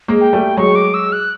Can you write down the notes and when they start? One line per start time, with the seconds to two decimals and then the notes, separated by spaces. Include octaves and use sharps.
0.08 G#3 A#3
0.21 G5
0.33 G3 A3
0.57 F#3 G#3 C#6
0.75 D6
0.94 E6
1.12 F#6